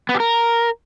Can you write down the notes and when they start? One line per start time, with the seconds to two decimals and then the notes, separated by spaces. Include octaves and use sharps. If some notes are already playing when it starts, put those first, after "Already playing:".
0.09 B3
0.14 G4
0.20 A#4